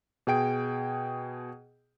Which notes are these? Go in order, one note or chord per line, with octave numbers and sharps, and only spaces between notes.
B2 G#4 G5 D7